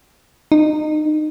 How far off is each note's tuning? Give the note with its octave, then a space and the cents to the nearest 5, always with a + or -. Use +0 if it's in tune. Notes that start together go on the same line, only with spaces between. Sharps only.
D#4 -25